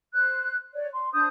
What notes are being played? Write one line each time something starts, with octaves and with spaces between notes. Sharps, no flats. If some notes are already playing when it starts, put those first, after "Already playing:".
C5 F#6
C#5 D5
C6
D4 C5 D#6 G6